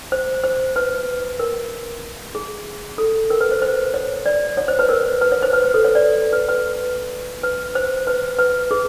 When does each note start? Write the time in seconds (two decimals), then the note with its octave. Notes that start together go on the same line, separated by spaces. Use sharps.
0.12 C5
0.44 C5
0.76 B4
1.40 A#4
2.35 G#4
2.98 A4
3.30 A#4
3.41 B4
3.51 C5
3.62 C5
3.94 C#5
4.26 D5
4.57 C#5
4.68 C5
4.79 B4
4.89 A#4
5.21 B4
5.32 C#5
5.42 C5
5.53 B4
5.63 B4
5.74 A4
5.84 C#5
5.95 D5
6.33 B4
6.48 B4
7.43 B4
7.75 C5
8.07 B4
8.39 B4
8.71 G#4